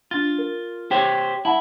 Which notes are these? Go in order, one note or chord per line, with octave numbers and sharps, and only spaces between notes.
D4 F4 A6
A#4
G4 C5 C#5 G5
E4 F#5 A5 B5